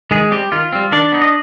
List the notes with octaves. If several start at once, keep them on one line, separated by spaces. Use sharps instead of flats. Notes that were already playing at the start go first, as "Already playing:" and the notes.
D#3 G#3 G#4
G3 C4 G4
D#3 F4
G3 C4
D#3 D4 D5
B3 D#4
D#5